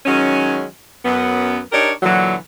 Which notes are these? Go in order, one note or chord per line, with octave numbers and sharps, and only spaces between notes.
D#3 F#3 G#3 C#4
F#2 B3
D4 D#4 G4 A#4 C#5
A#2 D3 E3 F#3